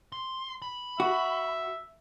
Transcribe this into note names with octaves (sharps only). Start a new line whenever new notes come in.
C6
B5
F#4 E5